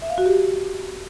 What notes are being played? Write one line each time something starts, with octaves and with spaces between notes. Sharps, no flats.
E5
F5
F#4
G4